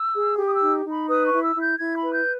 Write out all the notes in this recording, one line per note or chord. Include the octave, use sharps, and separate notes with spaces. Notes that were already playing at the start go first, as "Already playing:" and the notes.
Already playing: E6
G#4
G4
D#6
E6
D#4
D#4
B5
B4 D#6
C#6
E4
E6
E4
G6
E4 G#6
B5
B4
G6